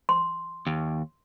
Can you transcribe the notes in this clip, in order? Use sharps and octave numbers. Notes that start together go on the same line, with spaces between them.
C6
D#2